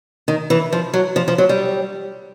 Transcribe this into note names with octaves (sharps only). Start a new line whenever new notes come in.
D#3
E3
F3
F#3
F3
F3
F#3
G3